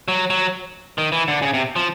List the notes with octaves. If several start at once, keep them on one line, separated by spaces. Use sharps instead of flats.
F#3
F#3
D#3
E3
D3
C#3
C3
F3